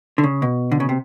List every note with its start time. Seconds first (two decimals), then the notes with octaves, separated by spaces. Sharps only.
0.18 D3
0.24 C#3
0.42 B2
0.72 D3
0.80 C#3
0.89 C3